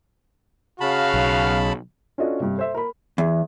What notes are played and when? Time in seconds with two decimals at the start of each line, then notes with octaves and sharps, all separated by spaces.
0.81 C#3 F#4 F5 A5 B5
1.14 B1
2.18 C#4 D4 F4 F#4 A4 D#5
2.40 G2 C3
2.57 A4 C5 E5
2.74 A#4 B5
3.18 E2